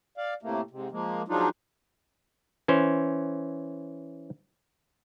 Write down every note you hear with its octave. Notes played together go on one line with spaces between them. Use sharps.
D5 F5
A2 C3 A3 A#3
G#2 C3
F3 G#3 A#3
F3 F#3 G#3 D4 D#4 F4
E3 C#4 C5